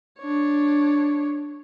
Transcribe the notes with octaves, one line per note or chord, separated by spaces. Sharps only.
D4 C#5